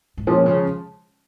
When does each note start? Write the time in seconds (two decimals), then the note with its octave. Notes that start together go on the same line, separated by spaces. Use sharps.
0.17 G#2
0.27 A#2 F3 G#3 C#4
0.46 C#3